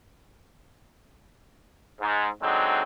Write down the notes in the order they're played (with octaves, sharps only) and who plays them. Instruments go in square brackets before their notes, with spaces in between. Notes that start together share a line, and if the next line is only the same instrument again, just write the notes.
[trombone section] G#2
D3 F#3 G#3 C4 D#4